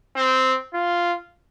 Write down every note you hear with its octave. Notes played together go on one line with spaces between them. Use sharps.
C4
F4